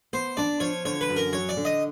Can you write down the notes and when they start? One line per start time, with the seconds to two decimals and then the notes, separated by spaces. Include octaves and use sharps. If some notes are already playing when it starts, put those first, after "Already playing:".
0.13 B3 C5
0.37 D4 D5
0.60 F3 C#5
0.85 D3 C#5
1.01 B4
1.09 F#2
1.16 A#4
1.33 F#3 C#5
1.49 D5
1.57 D3
1.65 D#5